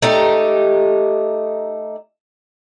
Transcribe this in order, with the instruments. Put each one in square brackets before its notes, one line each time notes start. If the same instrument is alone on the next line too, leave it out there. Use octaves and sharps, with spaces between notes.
[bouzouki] A3 D#4 G4